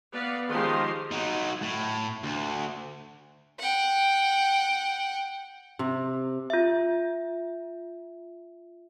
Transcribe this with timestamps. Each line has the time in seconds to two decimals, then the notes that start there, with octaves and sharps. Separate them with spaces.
0.12 B3 B4 D5 F5
0.50 D#3 F3 G#3 G4 A#4 C6
1.12 F#3 D#4
1.62 A2
2.23 D2
3.60 F#5 G5
5.79 C3
6.50 F4 E5